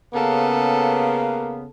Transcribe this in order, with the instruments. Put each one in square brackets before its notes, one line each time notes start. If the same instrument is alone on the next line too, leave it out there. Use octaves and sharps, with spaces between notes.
[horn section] C#3 B3 [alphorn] A#3 [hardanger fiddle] A4